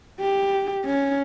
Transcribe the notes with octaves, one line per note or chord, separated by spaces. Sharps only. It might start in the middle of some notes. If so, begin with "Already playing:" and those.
G4
C#4